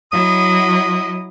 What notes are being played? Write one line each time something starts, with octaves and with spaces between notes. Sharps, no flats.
F#3 E4 D#5 D#6